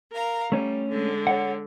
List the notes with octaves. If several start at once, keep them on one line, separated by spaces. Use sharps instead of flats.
A#4 F5 A#5
G3 A3 C#4
D3 G#3
C#5 F#5